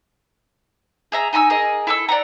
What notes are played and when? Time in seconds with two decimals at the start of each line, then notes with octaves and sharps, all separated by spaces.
1.12 G#4 E5 A#5
1.33 D#4 G#5 A#5 E6
1.50 G#4 A#4 D#5
1.87 E4 A4 E6
2.09 D5 F#5 A#5